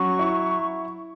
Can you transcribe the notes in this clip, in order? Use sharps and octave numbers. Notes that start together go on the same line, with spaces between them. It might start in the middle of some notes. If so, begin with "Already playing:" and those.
Already playing: F#3 C#4 C#6
E4